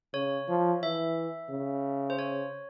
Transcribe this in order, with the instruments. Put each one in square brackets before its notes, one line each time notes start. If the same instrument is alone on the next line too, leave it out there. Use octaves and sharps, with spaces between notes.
[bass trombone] C#3 [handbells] C#5
[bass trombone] F3
[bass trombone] E3 [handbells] E5
[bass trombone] C#3
[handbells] C5
C#5